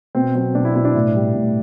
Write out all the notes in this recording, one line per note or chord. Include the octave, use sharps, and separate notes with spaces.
B2 C4
F#3 C4
B2 D4
E4
B2 E4
D4
A2
G3
A2